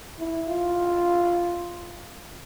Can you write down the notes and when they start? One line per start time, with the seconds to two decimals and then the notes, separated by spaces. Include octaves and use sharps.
0.18 E4
0.48 F4